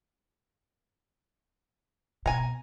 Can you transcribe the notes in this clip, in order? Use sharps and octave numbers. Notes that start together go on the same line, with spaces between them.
B2 G#5 A#5